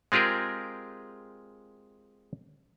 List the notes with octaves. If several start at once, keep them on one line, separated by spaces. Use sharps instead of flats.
G#3 C4 F4 G4 G#4 A#4